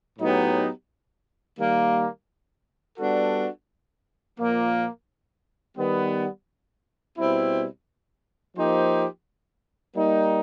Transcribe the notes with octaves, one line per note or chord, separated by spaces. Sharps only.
A2 F#3 B3 D#4 G4
D#3 G3 A#3
G3 B3 D4 F#4 A4
A#2 F3 A#3
D#3 G3 B3
B2 G3 C4 E4
F3 A#3 D#4 G4 C5
G3 A#3 D#4